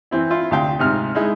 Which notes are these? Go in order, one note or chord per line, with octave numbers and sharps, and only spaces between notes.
E3 C4 E4
E4 F4
D2 C3 F5 G5
G#2 C3 F6
G#3 D#4 E4